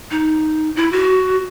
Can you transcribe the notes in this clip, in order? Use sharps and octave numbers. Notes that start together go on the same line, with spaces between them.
D#4
E4
F#4